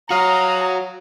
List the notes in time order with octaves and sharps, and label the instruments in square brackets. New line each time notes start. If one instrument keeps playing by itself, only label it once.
[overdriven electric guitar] F#4 C#5 [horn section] F5 [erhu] A#5 [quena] D#6